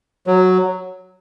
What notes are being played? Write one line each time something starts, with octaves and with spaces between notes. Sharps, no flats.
F#3